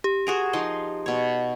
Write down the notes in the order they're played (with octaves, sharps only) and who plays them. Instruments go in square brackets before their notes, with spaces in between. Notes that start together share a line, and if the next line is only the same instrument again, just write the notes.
[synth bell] G4
[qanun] F#4 G#4 A#4
F3 D#4 C6
B2 C#5